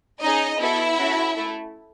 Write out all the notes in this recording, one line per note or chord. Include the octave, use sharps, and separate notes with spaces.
C#4 D#4 G#4 D#5
B3 E4 F#4 A4 E5
C#4 F#4 A4
A3 E4 A4